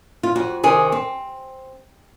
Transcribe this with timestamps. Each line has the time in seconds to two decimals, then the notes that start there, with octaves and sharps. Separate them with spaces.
0.23 F4
0.36 F2 F#4
0.63 C3 D#3 G#4
0.92 C4